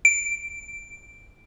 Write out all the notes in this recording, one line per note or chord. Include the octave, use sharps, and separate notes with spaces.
D7